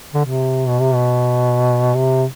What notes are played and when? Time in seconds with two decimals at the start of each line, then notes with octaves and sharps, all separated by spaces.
0.14 D3
0.25 C3
0.68 B2
0.80 C3
0.94 B2
1.95 C3